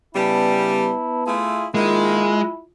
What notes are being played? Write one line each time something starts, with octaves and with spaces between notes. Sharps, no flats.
C#3 G3 B3 E4 B4 A5
A3 E4 F4 G#4
D#3 G#3 A#3 E4 F4